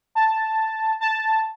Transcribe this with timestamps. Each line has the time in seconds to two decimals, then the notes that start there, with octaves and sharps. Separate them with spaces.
0.15 A5
1.01 A5